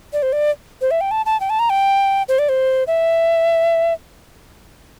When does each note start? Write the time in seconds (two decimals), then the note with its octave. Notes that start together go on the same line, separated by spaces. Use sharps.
0.13 D5
0.22 C5
0.33 D5
0.81 C5
0.91 E5
1.01 G5
1.11 A5
1.26 A5
1.40 G5
1.50 A5
1.59 A#5
1.70 G5
2.29 C5
2.39 D5
2.49 C5
2.87 E5